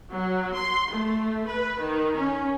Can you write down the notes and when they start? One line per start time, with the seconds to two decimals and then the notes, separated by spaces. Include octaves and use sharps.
0.11 F#3
0.53 C6
0.92 A3
1.47 B4
1.80 D#3
2.18 C#4